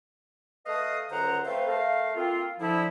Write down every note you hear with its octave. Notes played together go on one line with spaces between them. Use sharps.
A3 A4 B4 D#5 F5 D#6
C#2 F#2 D3 C5 F#5 A#5
A3 C4 A4 B4 C5 F5
A3 A4 A#4 F5
A#3 C4 F4
D3 F3 E4